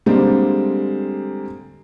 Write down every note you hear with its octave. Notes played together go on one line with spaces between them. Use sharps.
D3 G3 G#3 A#3 C4